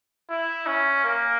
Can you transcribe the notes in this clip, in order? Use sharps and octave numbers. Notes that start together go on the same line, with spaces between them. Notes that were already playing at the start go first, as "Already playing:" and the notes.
E4
C#4
A#3